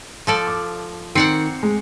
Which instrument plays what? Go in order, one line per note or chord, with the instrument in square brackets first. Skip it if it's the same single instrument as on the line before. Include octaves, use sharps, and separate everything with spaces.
[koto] F3 A4 D5
[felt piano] D6
[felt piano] D#3 C7 C#7 [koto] C4 D5 F#5
[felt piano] G#3